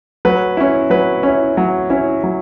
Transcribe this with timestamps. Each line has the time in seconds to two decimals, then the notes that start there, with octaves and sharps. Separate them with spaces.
0.25 F#3 B4
0.57 C#4 E4
0.90 F#3 B4
1.23 C#4 E4
1.57 F#3
1.90 C#4 E4
2.23 F#3